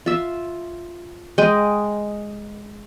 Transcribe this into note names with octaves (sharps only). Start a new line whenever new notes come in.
F4 E5
G#3 D#5 G5